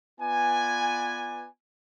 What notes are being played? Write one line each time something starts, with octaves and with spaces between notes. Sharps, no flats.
B3 F4 B4 D5 G#5